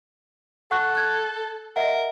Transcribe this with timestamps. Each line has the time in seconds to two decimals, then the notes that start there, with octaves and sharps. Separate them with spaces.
0.71 A4 F#5 C#6 F#6
0.95 F#6 G#6
1.76 A#4 D#5 E5 F#5